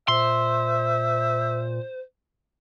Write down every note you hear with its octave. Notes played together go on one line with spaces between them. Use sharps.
A#2 C5 E5 C6